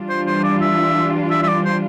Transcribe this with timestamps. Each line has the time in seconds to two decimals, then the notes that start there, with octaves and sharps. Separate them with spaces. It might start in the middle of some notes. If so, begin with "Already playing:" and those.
Already playing: E3 G3 D4 F4
0.09 C5
0.26 C5
0.44 D5
0.61 E5
1.30 E5
1.42 E5
1.47 D5
1.65 C5